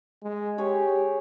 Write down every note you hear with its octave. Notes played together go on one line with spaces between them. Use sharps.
G#3
G4 G#4 C#5